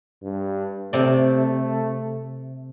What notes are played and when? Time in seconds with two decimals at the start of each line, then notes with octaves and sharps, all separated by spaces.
0.22 G2
0.93 C3 A3 D5